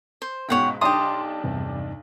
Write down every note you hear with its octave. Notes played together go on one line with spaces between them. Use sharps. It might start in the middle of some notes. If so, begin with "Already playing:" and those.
C5
C#2 G#2 B2 C#5 F#5 G5
B1 D4 G4 A5 C6 D#6
E2 G2 C3